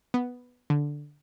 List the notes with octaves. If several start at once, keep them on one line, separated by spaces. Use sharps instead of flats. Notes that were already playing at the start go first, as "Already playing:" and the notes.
B3
D3